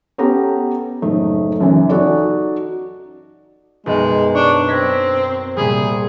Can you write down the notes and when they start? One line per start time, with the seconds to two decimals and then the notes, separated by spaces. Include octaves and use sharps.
0.18 B3 C#4 G4 A4 A#5
1.02 F#1 A2 A3 D#4
1.61 F#2 C#3 E3 D#4
1.89 D#4 F#4 A4 D5
3.86 B1 F#2 G#3
4.35 D4 C#5
4.69 C4 G#6 A#6 B6
5.57 C2 A#2 G3 G#4